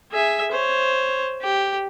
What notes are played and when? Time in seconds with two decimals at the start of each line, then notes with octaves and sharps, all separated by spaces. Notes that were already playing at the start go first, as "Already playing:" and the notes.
0.12 G#4 E5
0.51 C5 C#5
1.42 G4